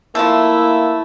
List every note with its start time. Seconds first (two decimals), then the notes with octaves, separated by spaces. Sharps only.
0.15 F3 A3 A#3 E4